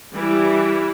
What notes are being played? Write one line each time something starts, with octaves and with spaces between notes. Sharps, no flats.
E3 G3 E4